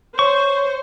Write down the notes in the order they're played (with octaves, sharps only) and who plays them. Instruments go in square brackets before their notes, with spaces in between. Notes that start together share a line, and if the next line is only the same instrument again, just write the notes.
[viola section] C5 [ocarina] C#5 [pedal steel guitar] C#6